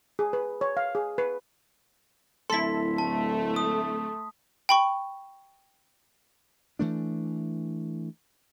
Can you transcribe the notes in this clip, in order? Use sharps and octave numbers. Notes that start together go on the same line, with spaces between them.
G#4
B4
C#5
F5
G#4
B4
D1 E4 A4 C6 B6
A3 A5
D#6
G5 B5 C#6
E3 A3 D4